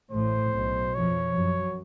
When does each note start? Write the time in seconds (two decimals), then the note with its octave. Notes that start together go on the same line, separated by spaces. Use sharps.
0.11 A1 A2 C5
0.52 B1 B2
0.94 F2 F3 C#5
1.35 F#2 F#3